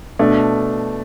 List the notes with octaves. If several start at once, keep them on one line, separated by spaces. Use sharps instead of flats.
B2 A3 D4